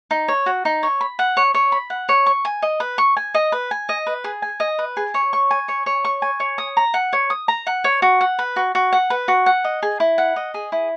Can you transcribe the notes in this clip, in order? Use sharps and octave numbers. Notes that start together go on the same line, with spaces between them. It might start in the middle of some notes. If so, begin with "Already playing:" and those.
D#4
C#5
F#4
D#4
C#5
B5
F#5
C#5
C#5
B5
F#5
C#5
C#6
G#5
D#5
B4
C#6
G#5
D#5
B4
G#5
D#5
B4
G#4
G#5
D#5
B4
G#4
C#5
C#6
G#5
C#5
C#5
C#6
G#5
C#5
D#6
A#5
F#5
C#5
D#6
A#5
F#5
C#5
F#4
F#5
B4
F#4
F#4
F#5
B4
F#4
F#5
D#5
G#4
E4
F#5
D#5
G#4
E4